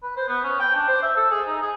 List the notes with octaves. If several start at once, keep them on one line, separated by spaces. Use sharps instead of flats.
B4
C5
B3
C#4
G5
D4
C5
E5
A4
G#4
D#4
G#4